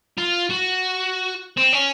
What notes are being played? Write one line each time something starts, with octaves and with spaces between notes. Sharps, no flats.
F4
F#4
C4
C#4